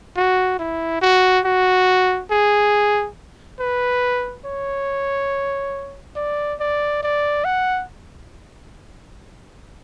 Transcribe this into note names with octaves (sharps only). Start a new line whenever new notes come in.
F#4
E4
F#4
F#4
G#4
B4
C#5
D5
D5
D5
F#5